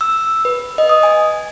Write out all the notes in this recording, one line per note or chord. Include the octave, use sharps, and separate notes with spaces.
E6
B4
D#5
D#6
G#5